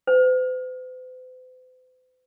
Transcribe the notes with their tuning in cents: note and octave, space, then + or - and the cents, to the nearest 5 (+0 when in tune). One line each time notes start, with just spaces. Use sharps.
C5 -45